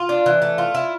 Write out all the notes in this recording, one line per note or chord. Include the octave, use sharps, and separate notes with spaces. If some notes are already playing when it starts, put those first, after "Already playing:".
Already playing: F4
D4
E3
A3
F4
E4